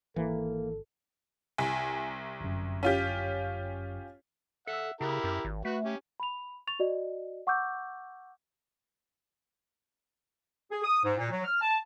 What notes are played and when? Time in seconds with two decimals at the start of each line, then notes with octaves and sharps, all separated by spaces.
0.16 G#1 E3 A#3 A4
1.58 C2 G#5
2.40 G1 F#2
2.83 C#4 F4 G4
4.67 A4 E5 F#5
5.01 C#3 E4 G4 A#4
5.24 F#2
5.45 G#1
5.65 A3 F#4 B4
5.85 C#4 G4
6.20 B5 F7
6.67 C#6 A6 F7
6.79 F#4 D5 D#5
7.47 F#5 C#6 D6 E6 G6
10.72 G#4
10.83 D#6
11.03 G#2
11.18 A#2
11.30 F#3
11.44 F6
11.61 A5